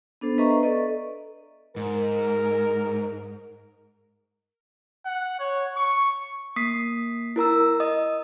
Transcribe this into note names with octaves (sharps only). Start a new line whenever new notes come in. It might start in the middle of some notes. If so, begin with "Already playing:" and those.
B3 D4 A4 C5
B4 D#5 E5 A#5 C#6
B4
A4 D5 D#5
G#2 A#4
F#5
C#5
C#6
A#3 D#6 B6 C7
E4 A#4 A#5 E6
D#5 D#6